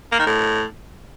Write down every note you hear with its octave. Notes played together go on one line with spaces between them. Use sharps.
A#3
D#3
A2